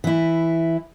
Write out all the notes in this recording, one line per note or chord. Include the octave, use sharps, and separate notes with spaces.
E3 E4